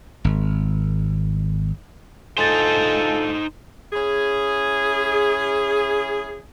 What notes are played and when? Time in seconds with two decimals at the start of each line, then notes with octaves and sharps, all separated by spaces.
0.24 G#1
2.38 D2 D#4 F4 A4 C5 G#5 A6
3.93 C#4 E4 G#4